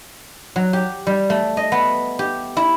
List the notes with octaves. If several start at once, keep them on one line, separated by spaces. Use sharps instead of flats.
F#3
G4
G3
A3
D#5
B3
G4
E4